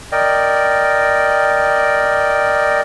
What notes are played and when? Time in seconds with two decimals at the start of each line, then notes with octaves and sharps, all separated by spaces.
0.12 A#4 D5 D#5 G5